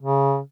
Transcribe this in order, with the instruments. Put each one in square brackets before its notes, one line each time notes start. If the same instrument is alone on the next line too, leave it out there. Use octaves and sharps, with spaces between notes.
[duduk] C#3